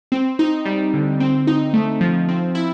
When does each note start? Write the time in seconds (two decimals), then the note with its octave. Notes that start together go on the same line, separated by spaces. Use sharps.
0.12 C4
0.39 D#4
0.65 G3
0.94 D3
1.20 C4
1.47 D#4
1.74 A3
2.01 F3
2.29 C4
2.55 E4